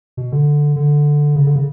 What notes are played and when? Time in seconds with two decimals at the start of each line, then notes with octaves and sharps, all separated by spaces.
0.17 B2
0.32 D3
0.76 D3
1.36 C#3
1.47 D3
1.56 C#3